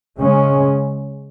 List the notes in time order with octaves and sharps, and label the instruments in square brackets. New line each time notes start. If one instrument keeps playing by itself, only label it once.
[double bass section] C#3 G#3 C#4